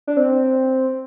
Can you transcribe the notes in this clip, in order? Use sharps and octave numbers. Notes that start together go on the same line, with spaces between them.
D4
C4